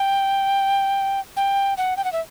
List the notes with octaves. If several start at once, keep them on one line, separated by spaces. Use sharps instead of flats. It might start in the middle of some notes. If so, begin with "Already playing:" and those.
Already playing: G5
G5
F#5
G5
F#5
E5